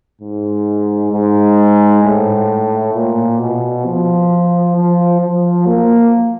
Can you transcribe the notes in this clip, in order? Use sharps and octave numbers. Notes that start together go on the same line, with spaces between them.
G#2
G#2
A2
A#2
B2
F3
F3
F3
A#3